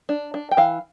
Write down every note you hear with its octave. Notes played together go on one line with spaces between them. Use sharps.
D4
D4
G5
E3 F5